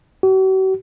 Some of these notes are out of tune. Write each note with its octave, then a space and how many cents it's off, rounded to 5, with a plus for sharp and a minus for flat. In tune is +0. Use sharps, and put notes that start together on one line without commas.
F#4 +45